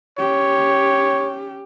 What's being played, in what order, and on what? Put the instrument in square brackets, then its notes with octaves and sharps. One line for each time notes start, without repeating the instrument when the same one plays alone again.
[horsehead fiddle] C#4 G4 [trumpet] C#5